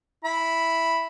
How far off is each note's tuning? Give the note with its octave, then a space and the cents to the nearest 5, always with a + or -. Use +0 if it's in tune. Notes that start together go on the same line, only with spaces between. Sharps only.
E4 +0 B5 +0